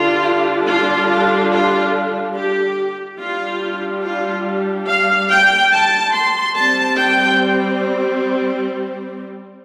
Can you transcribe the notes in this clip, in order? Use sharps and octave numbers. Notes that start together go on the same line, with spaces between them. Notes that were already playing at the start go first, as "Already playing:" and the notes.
Already playing: D3 G3 D4 F4
F4
F4
F4
G4
G3 D4 F4
F4
F5
G5
A5
C6
G3 C4 A5
G5